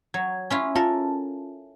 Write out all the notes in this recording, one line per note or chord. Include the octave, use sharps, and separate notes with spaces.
F#3 G#6
C#4 E4 F4
C#4 F4 A4 A#4 A5